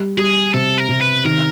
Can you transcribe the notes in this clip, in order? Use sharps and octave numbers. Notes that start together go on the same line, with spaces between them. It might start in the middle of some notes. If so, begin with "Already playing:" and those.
Already playing: G3
G3 G#4
C3 A4
A#4
C3
B4
D#3 A#4